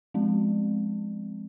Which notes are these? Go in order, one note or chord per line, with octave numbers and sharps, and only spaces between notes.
F3 G#3 C4